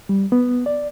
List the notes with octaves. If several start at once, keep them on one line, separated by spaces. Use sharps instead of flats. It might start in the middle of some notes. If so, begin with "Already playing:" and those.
G3
B3
D5